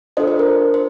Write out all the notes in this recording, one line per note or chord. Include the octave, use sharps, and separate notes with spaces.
D4 F4 A4 C5 D#5
C5
A#4
C5